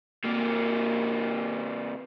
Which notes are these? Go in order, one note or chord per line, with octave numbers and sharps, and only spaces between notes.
C3 A#3